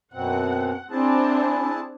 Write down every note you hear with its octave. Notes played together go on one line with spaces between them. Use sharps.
F#2 B2 C4 F#5
C4 D4 E4 G#4 A5